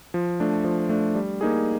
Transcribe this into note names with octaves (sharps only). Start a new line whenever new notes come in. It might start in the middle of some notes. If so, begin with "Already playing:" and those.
F3
A3 D4
F3
A3 D4
G3
A#3 D#4 G#4